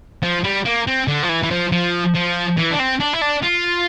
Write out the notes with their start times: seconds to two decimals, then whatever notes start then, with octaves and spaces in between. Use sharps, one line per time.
0.23 F3
0.44 G3
0.65 A#3
0.87 C4
1.08 D3
1.23 F3
1.29 E3
1.43 E3
1.51 F3
1.72 F3
2.14 F3
2.57 E3
2.71 D4
2.79 C4
3.00 D4
3.13 E4
3.21 D4
3.42 F4